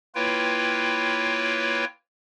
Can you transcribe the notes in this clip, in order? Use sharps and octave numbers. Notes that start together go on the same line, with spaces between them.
A#3 E4 F4 B4 C#5 G5